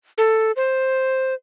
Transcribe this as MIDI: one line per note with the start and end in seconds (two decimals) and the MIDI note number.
0.18 0.52 69
0.56 1.34 72